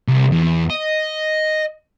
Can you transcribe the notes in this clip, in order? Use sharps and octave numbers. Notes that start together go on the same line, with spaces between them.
C2
E2
D#5